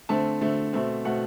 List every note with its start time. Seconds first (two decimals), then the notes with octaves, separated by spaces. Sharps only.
0.09 D3 A3 C4 A5
0.41 D3 A3 C4
0.73 B2 A3 C4
1.05 B2 A3 C4 F#5